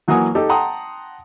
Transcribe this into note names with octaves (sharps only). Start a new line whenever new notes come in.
E3 F#3 A#3 F#5 G#5 D#6
D#4 G4 A4
F#5 G5 A5 A#5 C6 D#6